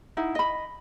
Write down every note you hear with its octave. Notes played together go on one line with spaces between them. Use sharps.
D#4 E4 F#5
D#5 B5